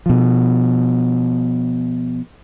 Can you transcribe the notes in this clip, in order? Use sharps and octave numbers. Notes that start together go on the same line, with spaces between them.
B2 F3